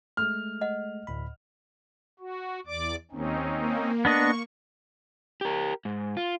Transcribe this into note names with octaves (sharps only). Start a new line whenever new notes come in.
G#3 A3 F6
D#5 F#5
D2 A2 B5
F#4
E2 D5 D6
D#2 C4 C#4 D#4
A#3
B3 D4 D#5 C#6
G4 A#4
G#2
F4